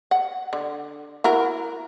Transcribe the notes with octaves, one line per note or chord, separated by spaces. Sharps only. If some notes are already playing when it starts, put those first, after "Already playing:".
F#5
D3
E4 F#4 A#4